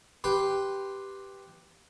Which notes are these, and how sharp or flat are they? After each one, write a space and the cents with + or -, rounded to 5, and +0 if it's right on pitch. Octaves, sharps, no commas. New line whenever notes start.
G4 +0 B4 +0 C6 +0